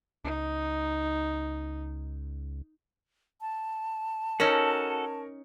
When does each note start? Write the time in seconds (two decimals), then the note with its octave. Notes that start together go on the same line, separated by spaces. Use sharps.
0.24 C#2 D#4
3.41 A5
4.40 C#4 D#4 F#4 A4 A#4 C#5 C#7